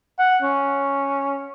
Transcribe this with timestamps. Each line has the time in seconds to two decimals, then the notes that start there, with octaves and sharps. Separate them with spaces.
0.19 F#5
0.42 C#4